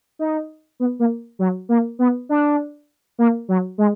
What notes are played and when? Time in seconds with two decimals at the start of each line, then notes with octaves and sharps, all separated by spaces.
0.19 D#4
0.80 B3
0.99 A#3
1.39 F#3
1.69 A#3
1.99 B3
2.29 D4
3.18 A#3
3.49 F#3
3.78 G#3